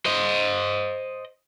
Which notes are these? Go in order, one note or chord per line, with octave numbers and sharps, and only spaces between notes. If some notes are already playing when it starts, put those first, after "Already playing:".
C5 D#5